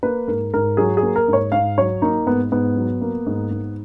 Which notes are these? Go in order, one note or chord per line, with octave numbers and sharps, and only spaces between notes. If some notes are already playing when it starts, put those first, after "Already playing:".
A#3 B4
G#2 A#4
G#2 A#4
F#3 G#4
G#4
A#3
A#4
G#2
C#5
G#2 F5
F#3 C#5
A#3 D#4
G#2 B3
G#2 B3
F#3
A#3
G#2
G#2